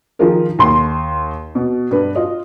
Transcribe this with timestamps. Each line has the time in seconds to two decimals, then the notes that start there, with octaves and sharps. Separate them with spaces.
0.19 D#3 F3 D#4 F4 G#4 A#4
0.59 D#2 C6
1.55 B2
1.91 G2 B4
2.15 F4 D#5